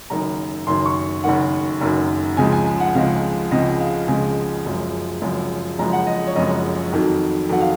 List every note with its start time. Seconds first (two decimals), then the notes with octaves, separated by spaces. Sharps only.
0.10 F#1 F#2 D#3 A#5
0.67 F#1 F#2 D#3 C6
0.86 C#6
1.24 F#1 F#2 D#3 F#5
1.81 F#1 F#2 D#3
2.37 C#2 C#3 F3 G#3 G#5
2.52 G#5
2.66 G#5
2.80 F#5
2.94 C#2 C#3 F3 G#3 F5
3.51 C#2 C#3 F3 G#3 D#5
3.80 F5
4.08 C#2 C#3 F3 G#3 G#5
4.65 F#1 F#2 F3 G#3
5.22 F#1 F#2 F3 G#3
5.79 F#1 F#2 F3 G#3 A#5
5.93 F#5
6.07 D#5
6.27 C#5
6.36 F#1 F#2 F3 G#3 D#5
6.92 F2 D#3 F#3
7.49 F2 D#3 F#3 F#5
7.61 F5